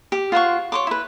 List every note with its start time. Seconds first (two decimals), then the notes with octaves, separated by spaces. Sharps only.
0.12 G4
0.32 F4 C5 F#5 C#6
0.72 C#5 C6 D6
0.87 E4 B4